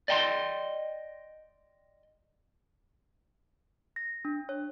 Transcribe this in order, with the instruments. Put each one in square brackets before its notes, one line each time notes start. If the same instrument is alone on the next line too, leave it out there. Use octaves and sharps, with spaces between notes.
[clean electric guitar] D5 D#5 G5 A5 C6
[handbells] A#6
D4
C#5